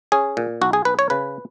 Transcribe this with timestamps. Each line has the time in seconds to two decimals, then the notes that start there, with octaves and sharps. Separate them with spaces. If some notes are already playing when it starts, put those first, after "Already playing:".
0.12 C#4 G#4
0.37 A#2
0.61 B1 F#4
0.73 G#4
0.85 B1 B4
0.99 C#5
1.10 C#3 B4